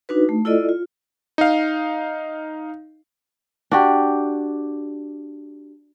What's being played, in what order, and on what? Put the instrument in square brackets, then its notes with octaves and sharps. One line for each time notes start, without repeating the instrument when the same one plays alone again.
[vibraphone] D4 D#4 F#4 B4
A3
E4 F4 A4 D5 D#5
F4
[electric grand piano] D#4 F5
[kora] D4 F#4 G4